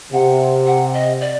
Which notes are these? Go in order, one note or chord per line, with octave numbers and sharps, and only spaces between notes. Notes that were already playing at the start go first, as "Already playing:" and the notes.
C3 F#5
F#5
D#5
D5